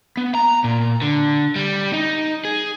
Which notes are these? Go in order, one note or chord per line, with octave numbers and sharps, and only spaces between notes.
B3
A#5
A#2
D3
G3
D#4
G#4